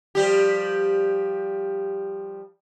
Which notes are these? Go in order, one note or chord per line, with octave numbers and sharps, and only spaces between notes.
F3 G3 G4